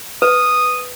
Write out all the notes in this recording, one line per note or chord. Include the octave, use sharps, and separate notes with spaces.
B4 D#6